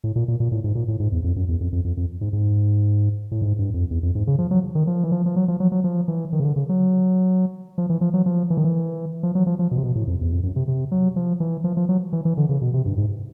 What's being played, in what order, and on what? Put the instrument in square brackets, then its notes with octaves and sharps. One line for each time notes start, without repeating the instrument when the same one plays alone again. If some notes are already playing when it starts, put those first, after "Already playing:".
[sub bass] A2
A#2
A#2
A#2
A2
G#2
A#2
A2
G#2
E2
F2
F#2
E2
F2
F2
F2
F2
G#2
G#2
A2
G#2
G2
F2
E2
F2
G#2
C#3
F3
F#3
D#3
F3
E3
F3
F3
F#3
F3
F#3
F#3
F3
E3
D#3
C#3
D3
C#3
F#3
F3
E3
F3
F#3
F3
E3
D#3
E3
F3
F#3
F3
F3
B2
C3
B2
A2
F2
E2
F2
F#2
C3
C3
F#3
F3
E3
F3
F3
F#3
E3
E3
D3
C#3
B2
C3
G2
G#2